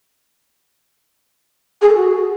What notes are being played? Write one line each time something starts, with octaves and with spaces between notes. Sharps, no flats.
G#4
A4
F#4